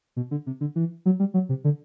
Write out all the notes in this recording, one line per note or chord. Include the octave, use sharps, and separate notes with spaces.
B2
D3
C3
D3
E3
F#3
G3
F#3
C3
D3